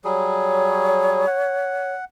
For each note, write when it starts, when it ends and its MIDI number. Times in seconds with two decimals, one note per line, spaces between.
0.04 1.26 54
0.04 1.26 55
0.04 1.26 68
0.04 1.92 73
1.27 2.05 78